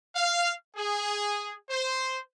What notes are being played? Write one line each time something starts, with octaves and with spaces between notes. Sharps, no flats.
F5
G#4
C5